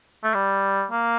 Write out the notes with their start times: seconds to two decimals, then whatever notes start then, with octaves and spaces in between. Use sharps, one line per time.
0.24 A3
0.34 G3
0.91 A#3